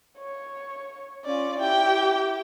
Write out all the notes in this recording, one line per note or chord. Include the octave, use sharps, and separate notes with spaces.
C#5
C#4 F4 D5
E4 G4 G5